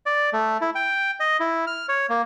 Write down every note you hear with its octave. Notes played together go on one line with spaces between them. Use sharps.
D5
A3
E4
G5
D#5
E4
F6
C#5
A#3